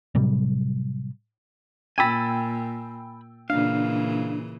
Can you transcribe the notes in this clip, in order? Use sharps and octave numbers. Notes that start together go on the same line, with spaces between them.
A2 C3 F#3 G3
A#2 G5 G#5 B5 E6 A6
A#2 C#3 E3 D4 F5